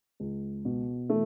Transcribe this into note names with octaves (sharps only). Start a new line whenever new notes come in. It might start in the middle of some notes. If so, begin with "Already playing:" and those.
C#2
B2
E3 A3